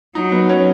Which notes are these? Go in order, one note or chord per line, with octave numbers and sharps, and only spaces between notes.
F#3 D#4
B3
C#4